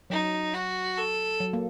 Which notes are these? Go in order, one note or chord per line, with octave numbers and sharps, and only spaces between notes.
F#3 D#4
F#4
A4
F#3
A#3